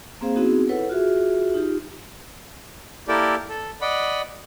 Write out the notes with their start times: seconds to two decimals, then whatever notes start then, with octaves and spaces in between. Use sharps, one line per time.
0.21 A#3 C4 G#4 C5 F5
0.36 B3 C4 D#4 E4 F#4 G#4
0.69 E4 A4 B4 C#5 F#5
0.89 F4 F#4 G#4 E5
1.54 D#4 F4 G4
3.08 A#3 E4 G4 A4 A#4 D5
3.48 A4
3.81 D5 D#5 F#5 B5